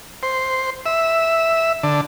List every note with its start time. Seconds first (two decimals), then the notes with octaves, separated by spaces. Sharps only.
0.23 C5
0.86 E5
1.83 D3